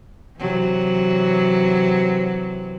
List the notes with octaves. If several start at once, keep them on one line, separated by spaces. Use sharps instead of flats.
C3 E3 F#3